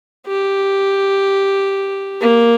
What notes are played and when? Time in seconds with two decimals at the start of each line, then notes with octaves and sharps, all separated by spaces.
0.27 G4
2.21 A#3